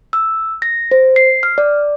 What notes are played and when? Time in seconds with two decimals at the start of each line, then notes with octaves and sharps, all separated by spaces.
0.13 E6
0.62 A#6
0.91 C5
1.16 C7
1.43 F6
1.58 D5